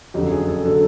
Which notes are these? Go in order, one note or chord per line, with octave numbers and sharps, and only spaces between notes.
F#1 F2 D3 F#3 G4
G#4
A4
D3 F#3 A4